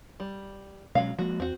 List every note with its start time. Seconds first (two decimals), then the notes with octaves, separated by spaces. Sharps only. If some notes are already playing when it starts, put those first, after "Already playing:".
0.20 G3
0.95 B2 F#3 G#3 C#4 F5
1.19 F3 G#3 A#3 F#4
1.40 E2 C4 F#4